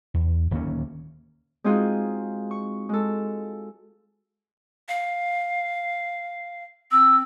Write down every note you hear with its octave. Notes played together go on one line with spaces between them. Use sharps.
E2
D1 D#3 A#3 C#4
G#3 C4 D#4 F4 F#4 G#4
C#6
G#3 A4
F5
C4 E6